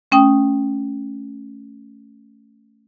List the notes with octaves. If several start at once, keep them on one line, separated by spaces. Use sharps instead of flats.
A3 C#4 G5 D#6